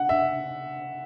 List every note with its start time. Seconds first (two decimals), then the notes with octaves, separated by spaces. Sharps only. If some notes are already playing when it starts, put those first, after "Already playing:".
Already playing: F#5
0.09 E5